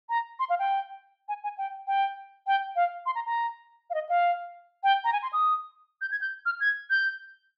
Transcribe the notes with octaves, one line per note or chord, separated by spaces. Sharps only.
A#5
C6
F5
G5
G#5
G#5
G5
G5
G5
F5
C6
A#5
A#5
F5
D#5
F5
G5
A#5
G#5
C6
D#6
G6
G#6
G6
F6
G#6
G6